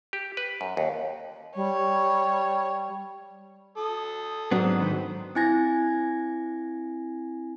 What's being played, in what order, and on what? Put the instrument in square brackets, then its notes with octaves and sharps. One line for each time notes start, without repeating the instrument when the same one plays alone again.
[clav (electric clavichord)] G4
B4
F#2
D#2
[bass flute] G3 [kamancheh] C#5
[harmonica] A4 D#6
[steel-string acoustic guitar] G#2 F#3 [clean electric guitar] B3 C4 D4
[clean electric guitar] D#3 [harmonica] B4 C5
[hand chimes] C4 E4 G#5 G#6 A#6